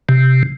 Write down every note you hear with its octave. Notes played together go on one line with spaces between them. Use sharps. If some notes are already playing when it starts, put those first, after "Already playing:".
C3